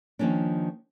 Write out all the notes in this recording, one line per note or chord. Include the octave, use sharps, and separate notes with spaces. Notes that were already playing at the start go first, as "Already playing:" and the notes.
D#3 F3 A#3 C#4 D4